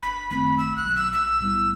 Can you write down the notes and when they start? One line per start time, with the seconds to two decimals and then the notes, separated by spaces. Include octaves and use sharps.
0.03 G1 B5
0.30 F#2 D#3 A3 C4 B5
0.57 B1 E6
0.76 F#6
0.86 B2 F#3
0.95 E6
1.13 B1 E6
1.41 A2 G3 B3 E4